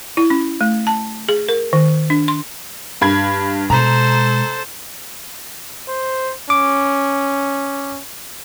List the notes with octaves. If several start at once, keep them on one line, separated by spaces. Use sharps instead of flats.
E4
C#4
A3
A5
G#4
A#4
D#3
D4
C6
G2 B5 G#6
B2 G#3 A4 C5 A#5
C5
C#4 D6